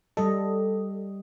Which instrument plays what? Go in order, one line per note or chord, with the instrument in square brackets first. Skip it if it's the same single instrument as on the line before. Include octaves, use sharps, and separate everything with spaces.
[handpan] G3 D#5 [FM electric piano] A4